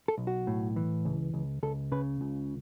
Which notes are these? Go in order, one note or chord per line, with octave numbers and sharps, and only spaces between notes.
A4
B1
F#4
A2
E3
C#2
C#2
C#2 A4
C#3 B4
C#2